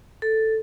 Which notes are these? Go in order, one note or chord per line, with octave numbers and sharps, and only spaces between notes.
A4